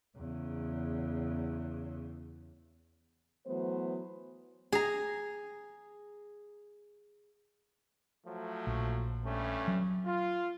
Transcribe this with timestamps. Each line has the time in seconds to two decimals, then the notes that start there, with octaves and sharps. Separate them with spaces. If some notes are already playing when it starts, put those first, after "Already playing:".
0.17 E2 C#3
3.47 E3 F#3 A3 B3 C5
4.72 G#4 A#5
8.25 F3 F#3 A3
8.67 A#1
9.25 G2 A3 C#4
9.68 F#3
10.05 F4